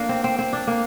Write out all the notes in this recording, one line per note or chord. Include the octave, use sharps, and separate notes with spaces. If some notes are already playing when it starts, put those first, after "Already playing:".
Already playing: A#3 D4
C4
C4
C4
D4
A#3